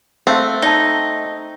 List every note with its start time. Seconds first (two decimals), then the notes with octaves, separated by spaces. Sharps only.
0.27 A3 C4 C5 F5
0.62 D#4 D5 A5